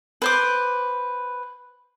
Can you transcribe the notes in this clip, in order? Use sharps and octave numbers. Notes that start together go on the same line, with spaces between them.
B4 C5 D6